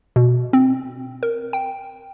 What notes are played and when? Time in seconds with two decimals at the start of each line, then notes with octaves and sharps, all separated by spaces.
0.16 B2
0.53 C4
1.23 A#4
1.53 G5